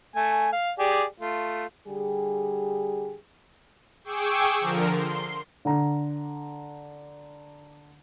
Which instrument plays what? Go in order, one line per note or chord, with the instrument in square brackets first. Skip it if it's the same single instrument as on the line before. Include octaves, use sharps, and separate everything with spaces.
[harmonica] A3 G#5
F5
G4 G#4 D5
A3 F4
[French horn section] D3 G3 G4 G#4
[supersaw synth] G#4 G5 C#6 D6 E6
D3 F3 A#4
C6
[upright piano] D3 A#5